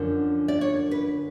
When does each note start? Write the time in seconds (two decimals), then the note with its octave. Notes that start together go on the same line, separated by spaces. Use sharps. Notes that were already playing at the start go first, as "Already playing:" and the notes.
Already playing: F#2 D3 F3
0.48 D5
0.61 C#5
0.91 B4